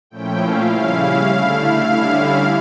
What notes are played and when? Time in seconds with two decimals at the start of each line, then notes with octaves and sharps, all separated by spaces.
0.10 A#2 F3 A3 C#4 E4 G5
0.40 F5
0.70 C#3 G3 C#4 E4
0.99 F5
1.29 D3 A3 E4
1.59 F5
1.89 D3 G3 C#4 E4
2.18 F5